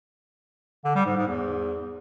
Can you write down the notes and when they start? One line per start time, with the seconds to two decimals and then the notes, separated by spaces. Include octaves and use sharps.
0.84 D3
0.95 G3
1.06 G#2
1.17 G#2
1.28 E2